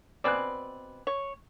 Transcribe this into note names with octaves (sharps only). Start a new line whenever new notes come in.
B2 C4 B4 D5 G#5 F#6
C#5